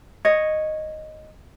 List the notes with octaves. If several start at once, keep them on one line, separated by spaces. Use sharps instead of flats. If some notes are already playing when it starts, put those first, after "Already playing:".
C#5 D#5